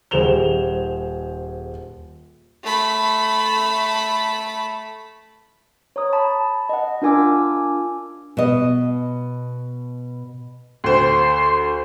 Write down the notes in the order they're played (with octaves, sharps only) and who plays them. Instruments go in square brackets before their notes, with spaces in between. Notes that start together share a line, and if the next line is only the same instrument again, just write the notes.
[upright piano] D#1 G#4 C5 E7 F7 G7
[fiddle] A3 B5
[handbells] C#5 A#5 D#6
A5 B5
D#5 F#5
D4 F4 A#4 G#5 D6 E6
[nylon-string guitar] B2 D#5
[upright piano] D2 C5 [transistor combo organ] C6